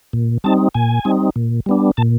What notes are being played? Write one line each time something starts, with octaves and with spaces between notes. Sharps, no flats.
A#2
G3 C4 D#4 A5
A#2 G#5
G3 C4 D#4
A#2
G3 B3 D4
A#2 A5